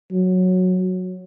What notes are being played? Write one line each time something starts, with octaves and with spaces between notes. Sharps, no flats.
F#3